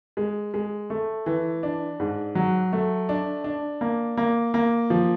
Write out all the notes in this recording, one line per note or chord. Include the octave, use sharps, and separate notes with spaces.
G#3
G#3
A3
E3
D4
G#2
F#3
A3
D4
D4
A#3
A#3
A#3
F3